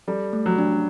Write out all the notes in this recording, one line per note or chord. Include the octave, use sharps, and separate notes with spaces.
G3 A4
A3
F#3
D4